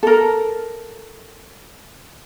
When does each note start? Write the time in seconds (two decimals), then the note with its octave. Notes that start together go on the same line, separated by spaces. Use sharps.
0.03 A4 A#4